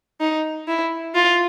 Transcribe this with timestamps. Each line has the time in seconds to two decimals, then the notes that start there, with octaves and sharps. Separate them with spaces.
0.20 D#4
0.67 E4
1.15 F4